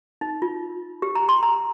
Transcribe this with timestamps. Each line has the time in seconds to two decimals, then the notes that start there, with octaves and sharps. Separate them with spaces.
0.21 D#4
0.42 F4
1.02 G4
1.15 A#5
1.29 C6
1.43 A#5